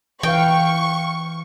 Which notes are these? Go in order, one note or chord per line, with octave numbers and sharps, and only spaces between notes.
E3 B4 F5 G5 C#6